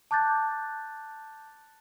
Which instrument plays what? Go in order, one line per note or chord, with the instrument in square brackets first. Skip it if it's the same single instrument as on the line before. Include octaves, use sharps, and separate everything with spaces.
[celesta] A5 D6 F#6 G6 A6